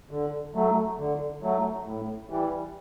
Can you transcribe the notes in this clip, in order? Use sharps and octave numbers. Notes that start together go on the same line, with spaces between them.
D3
F#3 A3
D3
F#3 A3
A2
E3 G3